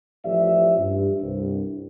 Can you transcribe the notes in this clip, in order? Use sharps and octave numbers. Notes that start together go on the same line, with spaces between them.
A1 F3 G4 D5 E5
G2
C2 G2